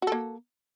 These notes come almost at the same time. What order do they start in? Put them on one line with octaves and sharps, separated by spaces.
F#4 A4 A#3